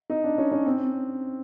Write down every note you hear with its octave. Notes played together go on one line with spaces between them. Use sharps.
D#4
D4
C#4
C#4
C4